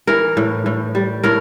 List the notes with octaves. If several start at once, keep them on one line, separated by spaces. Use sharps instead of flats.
E3 A#4
A2
A2
G3
A2 A#4